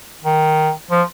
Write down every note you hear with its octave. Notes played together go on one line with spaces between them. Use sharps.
D#3
F3